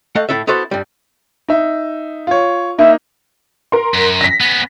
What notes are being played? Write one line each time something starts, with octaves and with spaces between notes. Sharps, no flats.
A3 D#5 F5 F#5
A2 E4 A4 E5
B3 E4 F#4 A4 C5
G2 G3
D#4 E5
F4 C#5
A#3 D#4 E5
A#4 C6
F#2
A#6 B6
B3 C#4